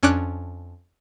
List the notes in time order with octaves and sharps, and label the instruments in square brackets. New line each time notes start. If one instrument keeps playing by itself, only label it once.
[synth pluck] F2 C#4 D4 D6 F#6